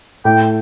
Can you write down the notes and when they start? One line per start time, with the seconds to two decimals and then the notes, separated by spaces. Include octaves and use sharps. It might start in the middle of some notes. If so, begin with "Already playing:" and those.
0.25 A2 G5